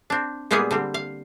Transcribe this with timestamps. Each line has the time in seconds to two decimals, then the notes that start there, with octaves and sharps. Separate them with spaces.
0.10 C4 D4
0.51 A#2 G3 G#3 A#3 B3 G#4
0.71 D3 G3 C4
0.94 F5